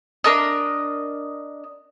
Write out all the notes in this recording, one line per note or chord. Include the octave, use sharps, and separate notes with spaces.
D4 A#4 D#5